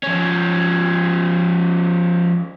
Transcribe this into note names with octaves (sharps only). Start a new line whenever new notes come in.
F3 C#4